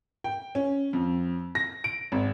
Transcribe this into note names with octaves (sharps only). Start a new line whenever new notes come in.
G5
C#4
F2
A#6
D7
G#1